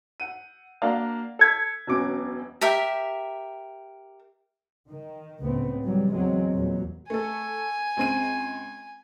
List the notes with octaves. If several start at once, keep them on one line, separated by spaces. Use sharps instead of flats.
F#5 D#7
A#3 D4 F#4 F5
A4 G#6 B6
E1 F#2 B2 C#4 D6 D7
G4 A#4 E5
D#3
C#2 A2 C#3 B3 C4
E3 F#3 G3
E2 F#3 G#3 C4
E2 A#2 F#3
A3 A4 G#5
C#2 C4 D#7